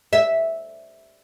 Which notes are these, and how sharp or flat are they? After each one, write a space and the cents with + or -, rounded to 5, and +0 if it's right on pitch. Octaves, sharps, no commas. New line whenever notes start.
E5 -5